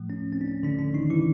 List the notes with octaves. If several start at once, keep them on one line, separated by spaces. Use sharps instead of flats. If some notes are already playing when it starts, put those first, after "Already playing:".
Already playing: A2 F3 A3
C#4
C4
D4
C#4
D3 D4
D3 D4
D#3 D#4
E3 E4